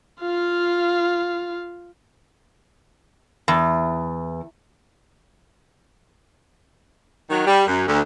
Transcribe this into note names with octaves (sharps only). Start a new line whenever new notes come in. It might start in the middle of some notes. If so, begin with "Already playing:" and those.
F4 F5
E2
D#3 F#3
G3
F#2
D2